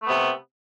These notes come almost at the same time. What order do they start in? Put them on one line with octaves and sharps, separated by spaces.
A3 B3 C3